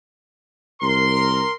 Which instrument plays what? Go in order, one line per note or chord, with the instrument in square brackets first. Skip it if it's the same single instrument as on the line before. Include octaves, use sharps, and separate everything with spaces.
[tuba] C2 [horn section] A#4 C6